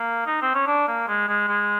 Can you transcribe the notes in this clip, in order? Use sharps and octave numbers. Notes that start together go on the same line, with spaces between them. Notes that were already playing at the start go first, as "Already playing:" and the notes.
Already playing: A#3
D#4
C4
C#4
D4
A#3
G#3
G#3
G#3